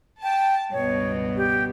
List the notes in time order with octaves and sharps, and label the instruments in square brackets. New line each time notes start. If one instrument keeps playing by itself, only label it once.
[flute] G5 [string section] A5
[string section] C#2 G2 B2 [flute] C#5
[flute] G4